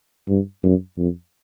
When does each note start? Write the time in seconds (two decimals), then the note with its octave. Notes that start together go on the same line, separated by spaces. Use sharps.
0.29 G2
0.63 F#2
0.98 F2